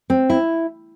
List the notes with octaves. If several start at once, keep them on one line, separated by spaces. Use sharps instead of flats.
C4
E4